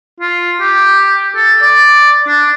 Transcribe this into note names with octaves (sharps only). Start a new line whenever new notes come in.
F4
G4
A4
D5
D4